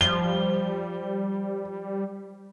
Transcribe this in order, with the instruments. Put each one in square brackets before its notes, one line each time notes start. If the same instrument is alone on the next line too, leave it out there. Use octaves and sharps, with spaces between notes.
[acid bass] F3 [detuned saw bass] G3 [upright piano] G7